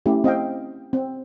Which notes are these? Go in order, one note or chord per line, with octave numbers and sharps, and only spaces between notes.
A3 C#4 E4 G4
C4 D#5 F5 G5
C4